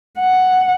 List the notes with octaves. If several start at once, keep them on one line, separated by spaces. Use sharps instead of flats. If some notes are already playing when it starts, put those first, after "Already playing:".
F#5